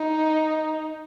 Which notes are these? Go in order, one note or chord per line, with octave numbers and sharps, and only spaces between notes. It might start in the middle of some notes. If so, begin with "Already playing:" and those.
Already playing: D#4